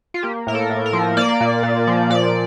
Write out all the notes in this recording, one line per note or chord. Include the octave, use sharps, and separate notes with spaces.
F4
A#3 G4
A2 A#4
A4
A2
A#4
F3
A#3 D5
A#2
A#2
F3
A#2 D5